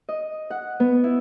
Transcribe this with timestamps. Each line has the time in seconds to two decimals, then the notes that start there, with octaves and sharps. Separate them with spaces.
0.09 D#5
0.50 F#5
0.80 B3
1.04 E4